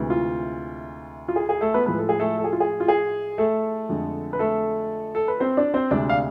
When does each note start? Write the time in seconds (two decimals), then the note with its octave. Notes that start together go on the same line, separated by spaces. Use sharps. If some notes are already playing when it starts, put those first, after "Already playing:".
Already playing: D2 C3 E3 G#3
0.10 F4
1.28 F4
1.36 G#4
1.49 G#4
1.61 A3 A4
1.74 B3 B4
1.86 A2 F3 G#3 B4
1.98 A4
2.09 G#4
2.19 A3 A4
2.38 A4
2.44 G#4
2.53 F4
2.60 G#4
2.80 F4
2.88 G#4
3.38 A3 A4
3.89 F2 D3 G#3
4.33 B4
4.39 A3 A4
5.15 A4
5.28 B4
5.40 C4 C5
5.57 D4 D5
5.74 C4 C5
5.91 D2 C3 G#3 D4 D5
6.09 F5